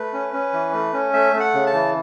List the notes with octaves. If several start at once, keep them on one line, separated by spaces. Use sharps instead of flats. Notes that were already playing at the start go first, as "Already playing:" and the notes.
Already playing: A3 B4
C#4
C#4
E3
A3
C#4
A3 E5
A3
F#5
C#3
A5
E3